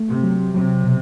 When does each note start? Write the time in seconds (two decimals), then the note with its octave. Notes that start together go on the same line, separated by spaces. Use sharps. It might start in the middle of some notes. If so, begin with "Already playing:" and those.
Already playing: A3
0.09 C3
0.23 F#3
0.54 C3 F#3
0.84 B2